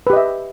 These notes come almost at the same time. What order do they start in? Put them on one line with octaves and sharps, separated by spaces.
B4 G4 D#5 E5